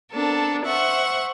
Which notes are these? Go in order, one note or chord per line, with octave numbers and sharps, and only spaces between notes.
B3 C4 D4 A4 A#4
C5 E5 F#5 C#6